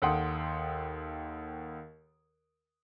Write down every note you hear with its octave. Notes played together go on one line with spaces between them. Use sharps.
D#2 A4 F#5 G5 C6 D#6